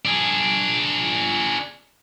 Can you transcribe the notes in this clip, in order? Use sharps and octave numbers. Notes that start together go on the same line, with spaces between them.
D4 G#4